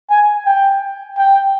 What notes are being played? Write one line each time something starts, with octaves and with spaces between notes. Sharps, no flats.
G#5
G5
G5